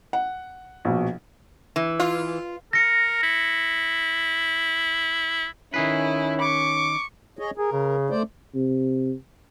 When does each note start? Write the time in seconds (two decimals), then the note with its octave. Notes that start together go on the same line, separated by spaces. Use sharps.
0.13 F#5
0.85 A#1 B2
1.76 E3
2.00 F4
2.73 A#4 A#6 C#7
3.23 E4
5.74 D#3 C#4 E4 G#4 B4
6.41 C#6 D6
7.39 G#4 C#5 D#5
7.57 G#4 A#4
7.72 C#3
8.10 A3 C5 D5
8.54 C3